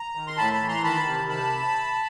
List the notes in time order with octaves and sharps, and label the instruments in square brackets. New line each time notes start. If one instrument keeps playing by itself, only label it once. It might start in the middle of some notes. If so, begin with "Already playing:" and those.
Already playing: [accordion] A#5
D#3
C6
A2 A5 B5
A5 B5
E3
A#5 C6
D#3 A5 B5
C3
A5 B5